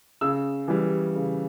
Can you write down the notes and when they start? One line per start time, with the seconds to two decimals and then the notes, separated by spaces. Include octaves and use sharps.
0.21 C#3 E6
0.68 E3 G3
1.16 C#3